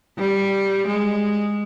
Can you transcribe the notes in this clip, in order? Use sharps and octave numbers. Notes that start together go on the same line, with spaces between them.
G3
G#3